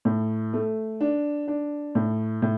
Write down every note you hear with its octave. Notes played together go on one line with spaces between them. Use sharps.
A2
A3
D4
D4
A2
A2